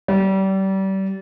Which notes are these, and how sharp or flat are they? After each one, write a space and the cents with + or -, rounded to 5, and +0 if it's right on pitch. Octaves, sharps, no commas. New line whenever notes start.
G3 -30